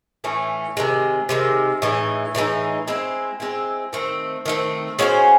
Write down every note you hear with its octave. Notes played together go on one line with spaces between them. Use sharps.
A2 E3 A3 C#4
C3 D#3 G#3
C3 D#3 G#3
A2 E3 G#3 D#4
A2 E3 G#3 D#4
G#3 C4 E4
G#3 C4 E4
D#3 A3 C4
D#3 A3 C4
G#3 C#4 F#4 C5